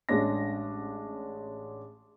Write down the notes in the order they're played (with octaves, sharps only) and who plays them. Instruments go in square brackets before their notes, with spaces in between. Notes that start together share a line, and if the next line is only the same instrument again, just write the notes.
[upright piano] A1 G#3 C#4 D4 A#6